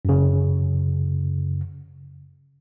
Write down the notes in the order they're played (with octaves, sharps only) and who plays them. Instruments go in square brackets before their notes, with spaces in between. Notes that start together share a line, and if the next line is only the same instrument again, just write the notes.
[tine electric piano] F#2 C#3